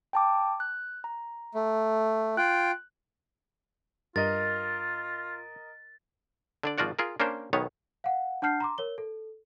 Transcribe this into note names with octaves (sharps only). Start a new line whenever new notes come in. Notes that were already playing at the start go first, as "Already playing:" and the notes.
G5 A5 D6
F#6
A#5
A3
F4 G5 F#6
G2 F4 A#4 D#5 A6
D3 D4 D5
G#1 F3 F4 F#4 D5 F#5
F4 G#4 A#4
A#3 C#4 D4 A#4 C5
B1 D#3 B3 C#5
F5 F#5
D4 F#5 A5 F6 G6 C7
A#5 C6 D6
A#4 C#5 G7
A4